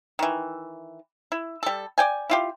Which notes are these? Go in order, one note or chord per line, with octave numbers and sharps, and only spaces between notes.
D#3 E3
E4
G3 A4
D5 G5 G#5
E4 F4 G4